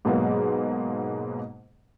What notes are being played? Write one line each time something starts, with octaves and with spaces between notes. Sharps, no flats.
G#2 B2 F#3 G#3 A#3 B3